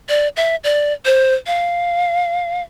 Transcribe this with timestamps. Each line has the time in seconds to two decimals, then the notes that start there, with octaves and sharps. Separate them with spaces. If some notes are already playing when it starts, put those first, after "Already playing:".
0.09 D5
0.36 E5
0.64 D5
1.06 C5
1.47 F5